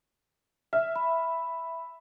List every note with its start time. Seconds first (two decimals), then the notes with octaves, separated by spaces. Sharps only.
0.73 E5 F6
0.96 B5